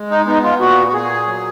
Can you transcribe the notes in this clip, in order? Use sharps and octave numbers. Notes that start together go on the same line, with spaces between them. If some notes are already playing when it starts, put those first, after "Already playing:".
Already playing: G#3
D#4
B3 D#4
F4
A#2 F#4
F#4
A#2 G#4
F#3